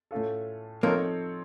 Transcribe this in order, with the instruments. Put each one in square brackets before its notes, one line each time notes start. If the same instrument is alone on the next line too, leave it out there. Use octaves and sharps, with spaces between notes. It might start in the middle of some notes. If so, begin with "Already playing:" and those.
[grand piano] A2 A3 C#4 F4 A4
[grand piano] F3 C4 D#4 A4 C#5 [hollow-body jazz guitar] A#3